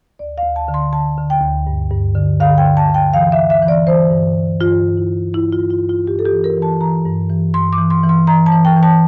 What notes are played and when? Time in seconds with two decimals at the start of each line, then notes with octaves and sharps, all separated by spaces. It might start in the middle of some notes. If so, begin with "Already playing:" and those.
0.19 D2 D5
0.38 F5
0.43 D2
0.56 A5
0.68 D3
0.74 C6
0.93 D3 A5
1.18 D3
1.30 G5
1.42 D2
1.67 G2
1.91 G2
2.15 D3
2.40 D3 F5
2.58 G5
2.65 D3
2.77 A5
2.89 D3 G5
3.13 E3 F5
3.32 E5
3.38 E3
3.50 E5
3.62 E3
3.68 D5
3.87 E3 C5
4.11 G2
4.35 G2
4.60 G2 F4
4.85 G2
4.97 E4
5.10 G2
5.34 G2 E4
5.53 F4
5.59 G2
5.70 F4
5.83 G2
5.89 F4
6.07 G2 G4
6.19 A4
6.25 G4
6.32 E3
6.44 A#4
6.57 E3
6.62 A5
6.80 E3 A#5
7.06 G2
7.30 E3
7.54 G2 C6
7.73 D6
7.78 E3
7.90 C6
8.03 E3
8.09 C6
8.27 E3 A#5
8.46 A5
8.52 E3
8.65 G5
8.76 E3
8.83 A5